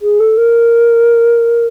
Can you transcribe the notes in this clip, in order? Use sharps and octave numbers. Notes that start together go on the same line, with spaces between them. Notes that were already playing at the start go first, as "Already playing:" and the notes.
G#4
A4
A#4